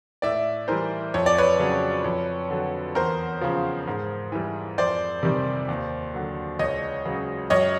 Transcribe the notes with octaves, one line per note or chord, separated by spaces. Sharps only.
A2 D5 E5
E3 G3 A#4 C5
F2 C#5
D5
B4 C#5
C#3 F#3
F2
D3 F#3
E2 A#4 C5
C#3 F3
G#2
E3 G3
F2 C5 D5
C3 D#3 G3
D#2
D3 F#3
C#2 C#5 D#5
C#3 F#3
F#2 C#5 D#5